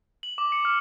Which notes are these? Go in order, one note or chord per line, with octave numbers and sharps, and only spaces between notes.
F#7
D6
C#7
F6